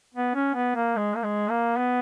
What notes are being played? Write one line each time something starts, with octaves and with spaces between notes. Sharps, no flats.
B3
C#4
B3
A#3
G#3
A#3
G#3
A#3
B3